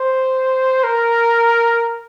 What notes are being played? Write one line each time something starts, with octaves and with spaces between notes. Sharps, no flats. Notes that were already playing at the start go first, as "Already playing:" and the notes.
Already playing: C5
A#4